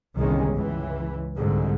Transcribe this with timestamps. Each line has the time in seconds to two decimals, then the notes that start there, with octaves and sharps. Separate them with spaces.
0.18 G1 C2 D#3 G#3 C#4
0.54 C#2 E3
1.38 C2 G#2 D3